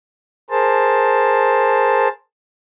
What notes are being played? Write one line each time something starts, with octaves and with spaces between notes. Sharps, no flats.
G#4 A#4 C5 A5